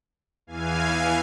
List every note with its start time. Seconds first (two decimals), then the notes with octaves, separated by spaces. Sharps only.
0.47 E2 E3 F5 G#5